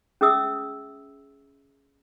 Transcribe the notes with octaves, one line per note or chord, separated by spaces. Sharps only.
C#4 G#4 E5 D#6 E6